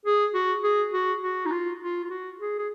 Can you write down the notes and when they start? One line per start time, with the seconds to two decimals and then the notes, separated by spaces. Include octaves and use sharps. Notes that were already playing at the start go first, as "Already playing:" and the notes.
0.05 G#4
0.34 F#4
0.64 G#4
0.93 F#4
1.22 F#4
1.46 D#4
1.51 F4
1.80 F4
2.04 F4
2.10 F#4
2.39 G#4
2.58 G#4